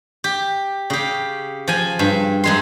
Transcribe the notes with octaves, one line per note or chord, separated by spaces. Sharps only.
G4
C#3 G4
F3 G#5
G2
F#2 G#3 C6